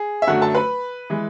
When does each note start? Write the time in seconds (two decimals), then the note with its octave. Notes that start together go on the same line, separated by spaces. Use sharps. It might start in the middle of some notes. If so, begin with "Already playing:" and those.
Already playing: G#4
0.22 E5
0.27 F#2 D3 F#3 A3 F#4 F#5
0.41 A4 A5
0.55 B4 B5
1.10 E3 G#3